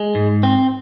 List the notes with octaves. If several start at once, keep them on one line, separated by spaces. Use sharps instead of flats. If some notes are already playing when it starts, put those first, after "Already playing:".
Already playing: G#3
G#2
C4